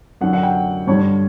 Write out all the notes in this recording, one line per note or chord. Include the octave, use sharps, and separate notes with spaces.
F#2 D3 F#5
F#5
G5
G2 D3 C#5